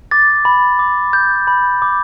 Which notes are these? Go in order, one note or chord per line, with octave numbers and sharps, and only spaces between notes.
D6 A6
B5
D6
G6
B5
D6